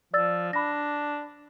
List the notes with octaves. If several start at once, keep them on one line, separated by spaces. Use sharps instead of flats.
F3 D5 E6 A6
D4 B5 A#6